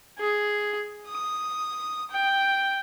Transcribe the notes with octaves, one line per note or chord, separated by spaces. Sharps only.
G#4
D#6
G5